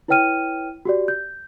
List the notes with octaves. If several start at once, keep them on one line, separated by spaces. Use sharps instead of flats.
E4 B4 C#5 G5 F6 D#7
F#4 G4 D5
G6